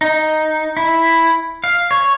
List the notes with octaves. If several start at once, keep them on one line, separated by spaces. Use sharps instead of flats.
D#4
E4
F5
C#5